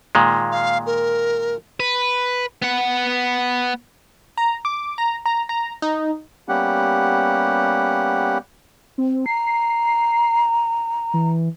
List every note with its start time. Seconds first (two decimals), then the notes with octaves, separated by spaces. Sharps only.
0.15 A#2 D#3 G#3
0.52 F5
0.86 A#4
1.80 B4
2.62 B3 F#5
4.38 A#5
4.65 D6
4.98 A#5
5.26 A#5
5.49 A#5
5.82 D#4
6.48 G3 A#3 B3 C#4 G4 F#5
8.98 C4
9.26 A#5 C7
11.14 E3